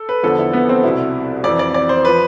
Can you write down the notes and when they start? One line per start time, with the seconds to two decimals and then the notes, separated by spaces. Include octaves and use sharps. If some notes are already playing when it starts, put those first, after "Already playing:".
Already playing: A4
0.09 B4
0.23 E2 D3 F3 A4
0.38 E4
0.53 B3
0.69 C4
0.83 C2 B2 E4
1.44 F2 E3 D5
1.59 D5
1.74 D5
1.89 C5
2.05 F3 B4